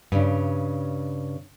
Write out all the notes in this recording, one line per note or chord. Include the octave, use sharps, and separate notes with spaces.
G2 C#3